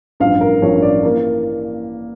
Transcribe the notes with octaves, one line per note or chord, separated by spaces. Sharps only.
A1 G2 F3 F5
A#4
A1 G2 F3 C#5
D5
E3 A#3 A#4